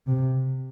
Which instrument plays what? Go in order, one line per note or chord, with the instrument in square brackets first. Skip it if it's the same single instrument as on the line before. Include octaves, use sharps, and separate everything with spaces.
[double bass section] C3